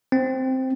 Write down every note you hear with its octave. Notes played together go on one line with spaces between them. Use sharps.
C4